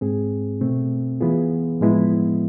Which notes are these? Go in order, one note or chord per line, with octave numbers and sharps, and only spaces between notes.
G#2 G#3 C4 G#4
B2 A3 C4
E3 B3 F4 G#4
A2 F3 G#3 B3 E4